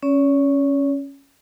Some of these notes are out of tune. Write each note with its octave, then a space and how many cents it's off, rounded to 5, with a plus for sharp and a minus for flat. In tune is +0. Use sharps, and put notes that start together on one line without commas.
C#4 +0 C#5 +40